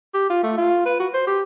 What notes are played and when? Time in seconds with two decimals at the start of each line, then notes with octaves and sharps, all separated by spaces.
0.14 G4
0.30 F4
0.43 A3
0.58 F4
0.86 B4
0.99 F#4
1.14 C5
1.27 G4